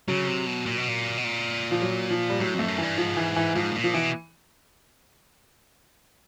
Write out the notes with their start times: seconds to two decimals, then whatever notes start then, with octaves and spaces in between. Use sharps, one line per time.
0.08 C#3 F#3
0.27 C3
0.46 B2
0.66 A#2
0.78 B2
0.88 A#2
1.18 B2
1.24 A#2
1.71 F3
1.82 F#3
2.10 F3
2.30 G3
2.40 A2 F#3
2.54 F2 A3
2.68 F#2
2.78 G2 E3
2.98 G#2 F3
3.17 E3
3.36 E3
3.55 G#2 F3
3.70 B2
3.75 A#2
3.84 F3
3.94 B2 E3